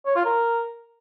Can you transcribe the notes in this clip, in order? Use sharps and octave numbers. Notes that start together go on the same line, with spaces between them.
C#5
F4
A#4